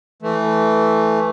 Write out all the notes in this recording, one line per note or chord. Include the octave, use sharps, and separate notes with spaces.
E3 A3